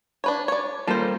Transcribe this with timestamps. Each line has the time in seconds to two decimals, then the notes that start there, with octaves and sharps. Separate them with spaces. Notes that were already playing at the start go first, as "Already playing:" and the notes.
0.24 D4 B4 C#5
0.48 C#5 D5
0.87 G3 A#3 F4 A4 C5